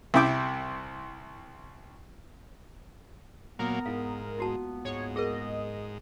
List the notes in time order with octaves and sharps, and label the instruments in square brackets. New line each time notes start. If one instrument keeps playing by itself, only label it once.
[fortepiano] C2 C3 E4 G5 D6
[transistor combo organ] A#2 F#3 A#3 [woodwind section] B3 [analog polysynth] A#4
[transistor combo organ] G#2 [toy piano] E4 F5
[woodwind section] C#2 A#3 B3 [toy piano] E4 F#4 A5
[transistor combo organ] G#2 [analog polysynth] C#5
[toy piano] G#4 A#4 [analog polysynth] D#5